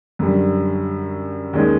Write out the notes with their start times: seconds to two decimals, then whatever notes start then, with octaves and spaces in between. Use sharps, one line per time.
0.19 F#2 D3 G3
1.53 D#2 D#3 G#3 C#4